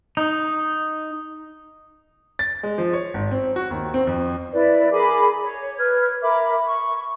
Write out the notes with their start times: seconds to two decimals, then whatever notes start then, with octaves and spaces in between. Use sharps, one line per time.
0.17 D#4
2.39 A6
2.63 G#3
2.78 F3
2.93 C#5
3.14 G#1
3.31 C4
3.56 F#4
3.71 D#2
3.94 C4
4.07 F2
4.53 E4 B4 D5
4.92 G#4 A#4 B5 D6
5.42 C#5
5.79 B4 F6 G#6
6.22 A#4 E5 B5 D6
6.67 C#6